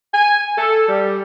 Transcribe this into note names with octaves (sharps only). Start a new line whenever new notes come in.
G#5
A4
G3